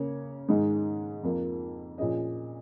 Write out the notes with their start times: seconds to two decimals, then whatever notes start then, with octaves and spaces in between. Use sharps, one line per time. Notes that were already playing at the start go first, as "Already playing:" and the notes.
Already playing: C#3 A#3 C#4 C#5
0.48 G#2 D#3 G#3 D#4
1.23 F2 F3 A#3 F4
1.98 A#2 F3 C#4 G#4 D#5